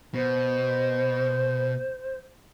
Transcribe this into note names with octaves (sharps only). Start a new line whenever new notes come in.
B2 C5